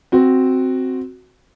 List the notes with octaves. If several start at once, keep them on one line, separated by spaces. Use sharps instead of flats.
C4 F#4